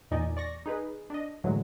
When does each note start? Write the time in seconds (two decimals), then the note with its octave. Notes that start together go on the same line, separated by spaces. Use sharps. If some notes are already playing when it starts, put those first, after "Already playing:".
0.11 E2 A#2 D#4 D5 D#5 G#5
0.37 D5 C#6 A#6
0.66 D#4 G#4 B4
1.10 D4 D#5
1.44 A2 D3 E3 F#3 G#3